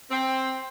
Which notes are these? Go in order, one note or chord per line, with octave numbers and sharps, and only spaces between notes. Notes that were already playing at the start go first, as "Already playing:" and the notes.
C4